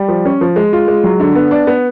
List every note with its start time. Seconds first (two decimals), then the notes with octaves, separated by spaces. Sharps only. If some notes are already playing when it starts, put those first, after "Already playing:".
Already playing: G3
0.08 F3
0.25 C#4
0.41 F3
0.56 G#3
0.73 F4
0.87 G#3
1.04 F#3
1.20 D3
1.35 B3
1.51 D4
1.67 B3